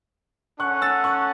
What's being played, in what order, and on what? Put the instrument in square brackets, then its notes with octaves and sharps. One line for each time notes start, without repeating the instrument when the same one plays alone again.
[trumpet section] C#4 A4 F#5 [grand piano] C#6 F#6
[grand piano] E6 A6
C#6 F#6